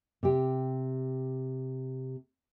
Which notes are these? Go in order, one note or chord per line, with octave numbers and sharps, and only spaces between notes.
C3 G4